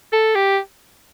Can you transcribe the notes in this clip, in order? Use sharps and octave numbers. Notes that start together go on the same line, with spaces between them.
A4
G4